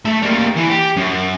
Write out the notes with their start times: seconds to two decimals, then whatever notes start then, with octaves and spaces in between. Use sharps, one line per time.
0.05 A3 A5
0.22 G3 A#3
0.56 E3
0.69 G4
0.97 F#2